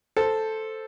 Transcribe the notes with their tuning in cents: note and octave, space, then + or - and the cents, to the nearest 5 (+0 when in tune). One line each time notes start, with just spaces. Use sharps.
A4 +0 C5 +0